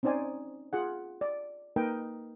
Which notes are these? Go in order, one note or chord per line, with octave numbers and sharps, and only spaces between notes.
C4 C#4 D#4 C5 D5 G#5
F4 G#4 F#5
D5
A#3 D#4 A#4 B4 D#5 G5